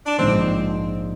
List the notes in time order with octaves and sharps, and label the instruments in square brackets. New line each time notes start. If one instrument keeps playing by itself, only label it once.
[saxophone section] D4
[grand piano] A#1 G#2 F3 G#3 [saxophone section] C4